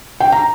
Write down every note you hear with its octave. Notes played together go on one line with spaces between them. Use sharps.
G5
A#5